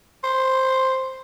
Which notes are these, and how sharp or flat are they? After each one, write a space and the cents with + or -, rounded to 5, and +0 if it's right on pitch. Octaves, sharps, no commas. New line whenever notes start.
C5 +5